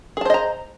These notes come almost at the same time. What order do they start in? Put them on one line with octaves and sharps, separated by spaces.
G#4 A5 C5 D#5 A#5